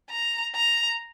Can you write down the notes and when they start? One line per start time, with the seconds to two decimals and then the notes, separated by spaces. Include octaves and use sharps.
0.11 A#5
0.55 A#5